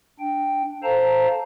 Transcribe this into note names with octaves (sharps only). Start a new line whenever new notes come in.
D4 G5
A4 C5 F5 A5 A#5